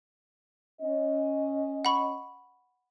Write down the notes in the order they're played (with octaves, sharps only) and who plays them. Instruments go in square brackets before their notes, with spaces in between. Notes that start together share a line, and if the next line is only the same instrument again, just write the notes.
[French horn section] C#4 D#5
[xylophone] F#5 B5 C#6